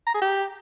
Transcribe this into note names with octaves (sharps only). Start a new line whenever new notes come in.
A#5
G#4
G4